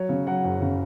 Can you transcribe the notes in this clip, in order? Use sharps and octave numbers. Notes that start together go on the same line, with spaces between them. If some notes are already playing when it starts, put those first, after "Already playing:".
Already playing: F#3 C#5
C#3
F#3 F#5
F#1
C#3